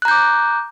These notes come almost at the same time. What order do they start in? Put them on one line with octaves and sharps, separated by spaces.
F#6 A#5 G6 D6